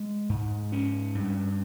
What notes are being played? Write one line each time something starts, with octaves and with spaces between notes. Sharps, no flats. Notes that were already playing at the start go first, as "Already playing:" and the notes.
Already playing: G#3
G#2
C#4
G2